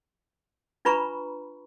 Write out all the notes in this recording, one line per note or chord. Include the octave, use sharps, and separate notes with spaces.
D4 F4 B4 A#5 B5 C#6